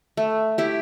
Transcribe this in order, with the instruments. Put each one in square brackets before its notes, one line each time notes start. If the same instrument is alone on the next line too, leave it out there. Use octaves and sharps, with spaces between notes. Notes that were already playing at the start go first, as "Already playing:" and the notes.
[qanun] A3
E4 G4